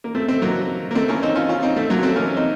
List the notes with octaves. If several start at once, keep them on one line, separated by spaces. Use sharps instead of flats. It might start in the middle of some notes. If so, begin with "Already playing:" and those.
A#3
A3 C4
A3 C4
F#3 A#3
A#3
A3 C4
A#3 C#4
C4 D#4
C#4 F4
C#4 F4
C4 D#4
A3 C4
F#3 A#3
A3 C4
A#3 C#4
C4 D#4